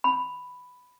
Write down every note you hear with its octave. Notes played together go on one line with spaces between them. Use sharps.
B5